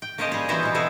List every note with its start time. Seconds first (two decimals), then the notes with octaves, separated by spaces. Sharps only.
0.02 G5
0.18 A#3 C#4 A#4 C5 D#5 A5
0.32 G3 G#4
0.49 E3 B3 F#4 C5 E5 A#5
0.63 B2 G3
0.74 C4 E4 G#4 A4 F5